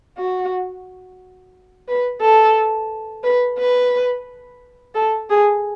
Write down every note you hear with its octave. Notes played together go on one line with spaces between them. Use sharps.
F#4
B4
A4
B4
B4
A4
G#4